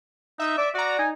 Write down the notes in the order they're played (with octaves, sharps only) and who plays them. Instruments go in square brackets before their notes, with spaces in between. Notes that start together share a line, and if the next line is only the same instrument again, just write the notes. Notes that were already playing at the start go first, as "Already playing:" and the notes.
[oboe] D#4 [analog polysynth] E5
[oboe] D5
[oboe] F#4 [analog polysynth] D5 A#5
[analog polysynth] D#4 [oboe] G#5